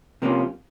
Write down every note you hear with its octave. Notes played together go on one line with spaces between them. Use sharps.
C3 F3 A#3 C#4 F4